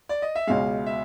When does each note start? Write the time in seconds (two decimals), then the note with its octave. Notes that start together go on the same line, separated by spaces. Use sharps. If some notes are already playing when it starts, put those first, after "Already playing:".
0.09 D5
0.22 D#5
0.35 E5
0.47 C#2 B2 G#3 F5
0.86 E5